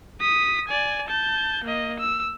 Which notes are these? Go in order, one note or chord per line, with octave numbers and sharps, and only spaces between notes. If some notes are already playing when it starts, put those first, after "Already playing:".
D#6 B6
D5 G#5
A5 G6
A#3 D#5
E6